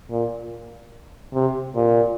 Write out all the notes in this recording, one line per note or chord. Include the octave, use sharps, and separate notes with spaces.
A#2
C3
A#2